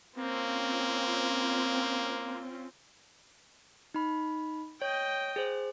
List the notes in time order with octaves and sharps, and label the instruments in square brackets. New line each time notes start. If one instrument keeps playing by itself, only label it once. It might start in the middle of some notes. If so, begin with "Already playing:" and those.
[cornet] A#3 [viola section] C4 C#4 F4
[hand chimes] D#4 B5
[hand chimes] C#5 [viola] D#5 G5
[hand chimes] G#4 C5